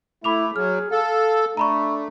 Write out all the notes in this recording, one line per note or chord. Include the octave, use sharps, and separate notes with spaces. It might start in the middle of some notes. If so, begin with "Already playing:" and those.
A3 E4 B5 D6 F7
F#3 G#4 F6
A4 F5
A3 D4 A#5 B5 C#6